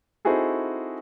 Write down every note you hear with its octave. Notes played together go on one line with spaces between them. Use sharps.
C4 D#4 E4 F#4 G#4 A4